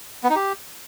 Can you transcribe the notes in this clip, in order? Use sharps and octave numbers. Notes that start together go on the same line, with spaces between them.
B3
D#4
G4